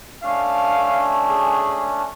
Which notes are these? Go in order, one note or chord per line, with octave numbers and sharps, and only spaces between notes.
A3 C#4 D4 F5
G#4